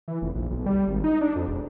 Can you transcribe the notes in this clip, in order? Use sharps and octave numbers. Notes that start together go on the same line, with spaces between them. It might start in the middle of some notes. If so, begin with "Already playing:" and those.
E3
F1
A#1
B1
G3
G#1
D#4
D4
F2
E1